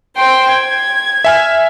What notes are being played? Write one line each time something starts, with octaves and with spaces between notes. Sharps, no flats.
C5 G5 C6
G#6
E5 G#5 F6